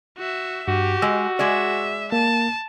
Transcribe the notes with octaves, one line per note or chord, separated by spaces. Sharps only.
F#4 E5
G2 F#4 G4
G#3 E6
G#3 G#4 D5 E5
A#3 A5